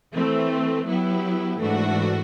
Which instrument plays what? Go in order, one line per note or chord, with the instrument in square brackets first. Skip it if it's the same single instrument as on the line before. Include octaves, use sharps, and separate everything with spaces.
[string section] E3 A3 C4
F#3 B3 E4 G4
G#2 E3 A3 D4 F#4